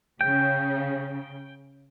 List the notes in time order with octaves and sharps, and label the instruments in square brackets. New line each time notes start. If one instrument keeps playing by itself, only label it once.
[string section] C#3 [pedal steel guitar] G5